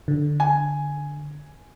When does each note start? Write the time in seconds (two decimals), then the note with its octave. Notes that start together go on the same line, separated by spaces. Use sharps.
0.08 D3
0.40 G#5